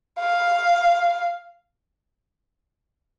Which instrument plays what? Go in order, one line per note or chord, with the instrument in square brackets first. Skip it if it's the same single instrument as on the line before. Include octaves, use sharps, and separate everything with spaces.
[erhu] F5